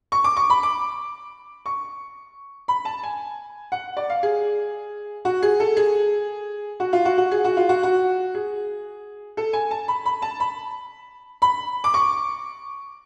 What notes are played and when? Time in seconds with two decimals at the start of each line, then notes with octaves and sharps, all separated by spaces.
0.12 C#6
0.24 D6
0.37 C#6
0.50 B5
0.63 D6
1.66 C#6
2.68 B5
2.85 A5
3.03 G#5
3.72 F#5
3.97 D5
4.10 F5
4.23 G#4
5.25 F#4
5.43 G#4
5.60 A4
5.77 G#4
6.80 F#4
6.93 F4
7.05 F#4
7.18 F#4
7.31 G#4
7.45 F#4
7.57 F4
7.69 F#4
7.83 F#4
8.35 G#4
9.37 A4
9.53 G#5
9.71 A5
9.88 B5
10.05 B5
10.22 A5
10.40 B5
11.42 B5
11.84 D6
11.94 C#6